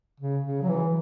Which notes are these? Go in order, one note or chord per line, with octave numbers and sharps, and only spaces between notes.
C#3
C#3
F#3
E3